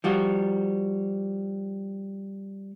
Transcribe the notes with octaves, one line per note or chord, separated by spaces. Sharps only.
F3 G3 F#4